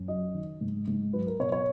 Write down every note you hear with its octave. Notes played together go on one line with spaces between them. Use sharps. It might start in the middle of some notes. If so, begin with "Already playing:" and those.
Already playing: F#2
F#3 D#5
D#3
G#2
G#2
F#3 B4
A#4
B2 C#5
C#5